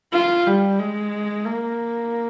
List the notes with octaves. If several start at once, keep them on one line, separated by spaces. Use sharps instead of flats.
F4
G3
G#3
A#3